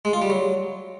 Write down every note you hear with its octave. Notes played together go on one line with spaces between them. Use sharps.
G#3
F4
G3
F#3